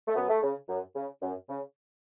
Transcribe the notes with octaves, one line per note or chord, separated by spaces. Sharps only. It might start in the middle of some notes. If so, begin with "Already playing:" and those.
A3
F#2 B3
A3
C#3
F#2
C#3
F#2
C#3